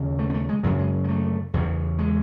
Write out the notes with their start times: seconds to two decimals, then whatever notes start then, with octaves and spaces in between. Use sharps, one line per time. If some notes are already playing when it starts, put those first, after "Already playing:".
Already playing: D#2 C#3
0.19 A3
0.30 B3
0.34 A3
0.49 G#3
0.63 F#2 C#3 F#3
0.79 G#3
1.04 G#3
1.09 A3
1.54 E2 C#3
1.99 G#3